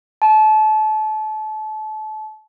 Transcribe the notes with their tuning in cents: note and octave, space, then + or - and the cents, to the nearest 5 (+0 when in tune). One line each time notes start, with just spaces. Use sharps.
A5 -30